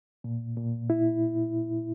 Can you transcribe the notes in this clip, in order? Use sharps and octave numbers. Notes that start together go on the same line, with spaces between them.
A#2
A#2
E4